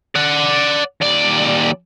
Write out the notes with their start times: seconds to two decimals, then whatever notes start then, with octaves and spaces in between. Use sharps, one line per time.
0.15 D5 F#5
1.01 D#2 D5